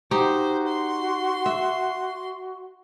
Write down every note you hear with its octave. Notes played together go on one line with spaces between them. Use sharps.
D#4 F#4 G4 C5
C6
E5